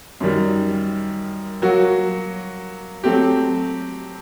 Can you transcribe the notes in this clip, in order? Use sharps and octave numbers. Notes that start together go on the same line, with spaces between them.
F#2 D#3 G3
F#3 A#3 F#4
F#3 A3 C4 G4